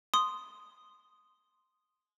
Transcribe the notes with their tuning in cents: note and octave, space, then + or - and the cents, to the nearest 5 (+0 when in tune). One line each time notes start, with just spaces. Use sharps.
C6 -5 D#6 -5